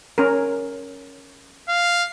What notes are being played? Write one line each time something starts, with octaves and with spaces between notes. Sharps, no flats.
C#4 A#4
F5